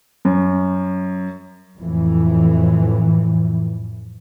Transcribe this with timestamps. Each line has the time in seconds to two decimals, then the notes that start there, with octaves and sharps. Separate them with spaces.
0.25 F#2
1.78 F2 A2 E3